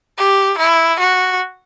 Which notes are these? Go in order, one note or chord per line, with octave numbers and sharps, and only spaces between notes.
G4
E4
F#4